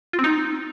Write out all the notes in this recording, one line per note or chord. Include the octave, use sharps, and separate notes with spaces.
F4
C4
D#4